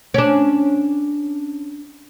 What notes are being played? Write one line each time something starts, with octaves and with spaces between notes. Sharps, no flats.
C#4 D4